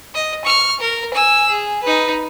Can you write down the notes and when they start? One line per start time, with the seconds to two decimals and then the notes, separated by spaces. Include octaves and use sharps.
0.14 D#5
0.45 C#6 F6
0.81 A#4
1.14 G#5 E6
1.49 G#4
1.83 D#4 B4